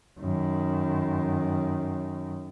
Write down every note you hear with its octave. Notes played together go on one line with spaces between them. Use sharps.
F#2 D#3